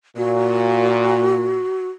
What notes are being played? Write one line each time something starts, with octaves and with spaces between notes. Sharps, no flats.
A#2 F#4